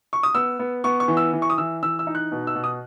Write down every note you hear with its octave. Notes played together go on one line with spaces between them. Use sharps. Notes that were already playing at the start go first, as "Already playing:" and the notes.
C#6
D#6
B3 E6
B3
B3 C#6
C#6
E3
E6
E3
C#6
D#6
E3 E6
E3 E6
E6
D#4
F#6
B2
E6
B2
D#6